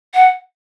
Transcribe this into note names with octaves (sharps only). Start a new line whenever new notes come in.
F#5